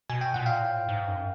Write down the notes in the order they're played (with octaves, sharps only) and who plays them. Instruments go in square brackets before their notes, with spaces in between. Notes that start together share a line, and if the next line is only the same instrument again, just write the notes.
[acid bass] B2 [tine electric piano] G#5
[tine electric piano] G5
[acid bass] A#2 [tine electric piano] F#5
[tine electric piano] F5 G5
[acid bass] A2
G#2
F#2